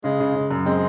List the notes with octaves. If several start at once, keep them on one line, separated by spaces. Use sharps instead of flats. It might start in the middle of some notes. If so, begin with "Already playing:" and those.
C#3 G#3
C#3
C#3
F#2
G#3 C4